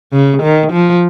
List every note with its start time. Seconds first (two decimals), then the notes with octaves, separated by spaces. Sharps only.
0.13 C#3
0.43 D#3
0.73 F3